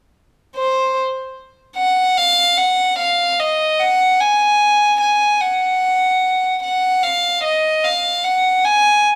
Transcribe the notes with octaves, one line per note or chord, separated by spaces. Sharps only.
C5
F#5
F5
F#5
F5
D#5
F#5
G#5
G#5
F#5
F#5
F5
D#5
F5
F#5
G#5